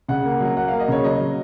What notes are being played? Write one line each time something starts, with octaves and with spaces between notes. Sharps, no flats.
C#3 F#5
A#3
F#3
A#3 F#5
A#3 F5
D#5
C#3 C#5
F#3 D#5
F#3